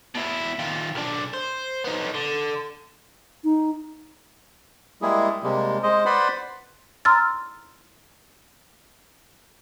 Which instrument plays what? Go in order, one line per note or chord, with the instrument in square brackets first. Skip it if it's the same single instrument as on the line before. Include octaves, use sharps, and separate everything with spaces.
[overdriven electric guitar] B2 E4
D#3 F4
B1 D4
C5
B3 D#4
D3
[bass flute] D#4
[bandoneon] G3 G#3 A#3 E4 G#4
C3 G3 G#3 A#3
G#3 C5 D#5
B4 C5 D5 F#5 B5 C6
[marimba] A#5 C6 E6 F6 A6